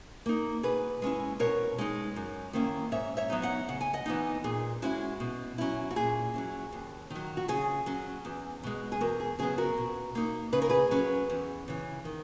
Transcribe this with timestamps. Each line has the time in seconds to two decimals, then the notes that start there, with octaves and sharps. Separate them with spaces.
0.26 A#3 D#4
0.63 B2 G#4 B4
1.02 G#3 C#4 E4
1.39 B2 A#4 C#5
1.78 G#3 D#4
2.16 F#2
2.53 D#3 A#3 C#4 E4
2.92 G#2 C#5 E5
3.17 C#5 E5
3.30 F#3 B3 D#4
3.42 D#5 F#5
3.69 C#3 F#5
3.81 G#5
3.93 D#5 F#5
4.06 E3 B3 D#4
4.44 A#2 G#4
4.82 G#3 C#4 E4 F#4
5.20 B2
5.58 F#3 C#4 E4
5.91 F#4
5.96 A#2 G#4
6.34 F#3 C#4 E4
6.72 D#2
7.10 D#3 F#3
7.37 F#4
7.48 C#3 G#4
7.86 F#3 C#4
8.25 E2
8.63 B2 G#3
8.92 G#4
9.01 E2 F#4 A#4
9.20 G#4
9.39 C#3 F#3 B3 G#4
9.58 F#4 A#4
9.78 B2
10.15 A#3 D#4
10.53 C#3 B4
10.62 A#4
10.69 G#4 B4
10.91 F#3 C#4
11.30 E2
11.68 C#3 E3
12.05 D#3